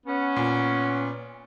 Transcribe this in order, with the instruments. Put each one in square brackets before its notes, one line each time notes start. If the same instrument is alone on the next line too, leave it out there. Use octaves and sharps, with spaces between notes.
[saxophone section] B3 C#4
[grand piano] A#2